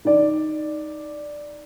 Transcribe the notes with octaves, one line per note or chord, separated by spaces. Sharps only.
D#4 D5